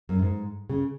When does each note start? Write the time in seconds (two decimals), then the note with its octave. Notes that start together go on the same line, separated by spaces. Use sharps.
0.09 F#2
0.22 G#2
0.69 C#3